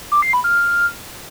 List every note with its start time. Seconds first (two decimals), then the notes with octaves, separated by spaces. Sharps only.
0.12 D6
0.22 C7
0.33 B5
0.44 F6